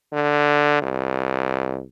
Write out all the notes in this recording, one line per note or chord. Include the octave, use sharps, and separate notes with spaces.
D3
C2